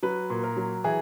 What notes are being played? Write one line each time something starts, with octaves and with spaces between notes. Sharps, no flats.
F#3 B4
A#2
A#4
F#3
E3 G#4